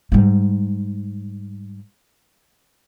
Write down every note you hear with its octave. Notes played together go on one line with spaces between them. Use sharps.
G#2 G3